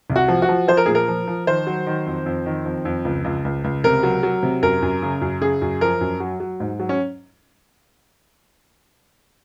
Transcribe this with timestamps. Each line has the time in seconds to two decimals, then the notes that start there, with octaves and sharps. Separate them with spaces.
0.10 C2
0.16 F#4
0.28 F3
0.42 F#4
0.49 F3
0.68 F3 C5
0.77 A#4
0.86 A#2 G#4
0.95 A#4
1.08 F3
1.27 F3
1.47 D#3 C5
1.67 F#3
1.87 D#3
2.06 F2
2.26 F2
2.46 D#3
2.65 F2
2.85 F2
3.05 C#2
3.24 C#2
3.45 C#2
3.64 C#2
3.84 C3 A#4
4.03 F#3
4.23 F#3
4.43 C3
4.62 F#2 A#4
4.82 F#2
5.02 C#3
5.21 F#2
5.41 C#3 G#4
5.62 F#2
5.81 F3 A#4
6.01 F#2
6.20 F#3
6.40 F#3
6.60 G#2
6.80 F#3
6.89 C#4